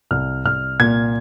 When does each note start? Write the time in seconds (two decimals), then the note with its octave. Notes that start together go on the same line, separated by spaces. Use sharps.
0.11 C2 F6
0.45 C2 F6
0.79 A#2 G#6